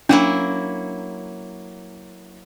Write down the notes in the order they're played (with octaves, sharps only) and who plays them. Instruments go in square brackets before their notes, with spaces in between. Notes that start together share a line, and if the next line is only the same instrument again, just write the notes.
[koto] F#3 A#3 E4 [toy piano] C#4 D4